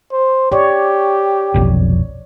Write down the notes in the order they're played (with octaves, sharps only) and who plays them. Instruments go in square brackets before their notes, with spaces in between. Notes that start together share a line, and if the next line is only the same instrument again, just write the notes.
[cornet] C5
[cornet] G4 [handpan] C#5 D5
[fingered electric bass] F1 B1 F2